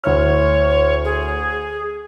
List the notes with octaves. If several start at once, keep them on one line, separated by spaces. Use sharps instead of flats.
D2 E4 C#5 F6
G#4